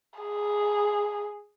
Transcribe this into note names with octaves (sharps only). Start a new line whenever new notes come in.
G#4